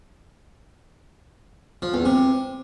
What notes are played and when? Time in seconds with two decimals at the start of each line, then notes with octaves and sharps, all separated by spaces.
1.82 F3
1.94 E2
2.05 C3